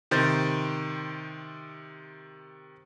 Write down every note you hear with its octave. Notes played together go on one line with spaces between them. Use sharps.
C3 D#3 C5 G6 A6